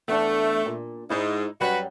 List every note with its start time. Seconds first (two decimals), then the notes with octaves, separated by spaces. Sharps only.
0.08 E2 A3 D4 A5
0.66 A#2
1.10 G#2 D#4 E4
1.61 F#2 F#3 G3 F#4 B4